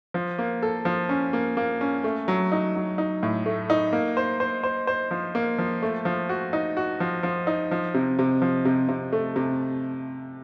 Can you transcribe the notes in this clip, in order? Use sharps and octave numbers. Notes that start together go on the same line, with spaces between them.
F3
A#3
A4
F3
C#4
A#3
A#3
C#4
A3
F#3
D#4
F#3
D#4
A2
A3
D#4
A#3
C5
C5
C5
C5
F3
A#3
F3
A3
F3
F#4
D#4
F#4
F3
F3
D#4
F3
C3
C3
F3
C3
C3
A3
C3